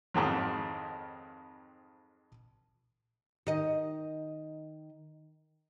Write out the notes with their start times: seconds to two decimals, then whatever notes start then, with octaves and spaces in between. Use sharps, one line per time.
0.14 F2 G#2 D#3 F#3
3.47 D#3 D#5